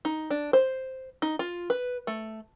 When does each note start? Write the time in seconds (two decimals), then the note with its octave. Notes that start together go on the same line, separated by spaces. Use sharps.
0.05 D#4
0.30 D4
0.53 C5
1.22 D#4
1.39 F4
1.70 B4
2.07 A3